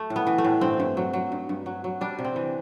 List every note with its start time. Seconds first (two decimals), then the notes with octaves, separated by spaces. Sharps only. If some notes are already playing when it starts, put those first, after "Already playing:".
Already playing: A3
0.10 A2
0.16 B3
0.27 E3
0.38 A3
0.44 A2
0.61 G2 C4
0.80 G2
0.97 F#3
1.13 F#3
1.32 G2
1.49 G2
1.66 F#3
1.84 F#3
2.01 G3 D4
2.19 C3
2.25 C4
2.36 E3